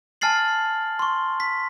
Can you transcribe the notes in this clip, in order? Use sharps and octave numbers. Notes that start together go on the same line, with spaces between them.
G#5 A5 F6 A6 C7 F#7
C6 C#6
B6